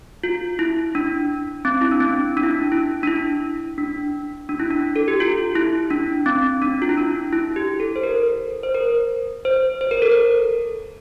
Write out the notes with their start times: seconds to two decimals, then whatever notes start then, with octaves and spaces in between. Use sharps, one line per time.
0.24 F4
0.59 E4
0.95 D4
1.65 C4
1.81 E4
1.91 D4
2.00 C4
2.37 D4
2.43 E4
2.51 D4
2.72 E4
3.03 D4
3.07 E4
3.78 D4
4.49 D4
4.60 E4
4.71 D4
4.96 A4
5.08 G4
5.20 F4
5.55 E4
5.91 D4
6.26 C4
6.62 D4
6.82 F4
6.89 E4
6.98 D4
7.33 E4
7.56 G4
7.80 A4
7.96 C5
8.03 A#4
8.63 C5
8.74 A#4
9.45 C5
9.81 C5
9.91 A#4
10.02 A4
10.12 A#4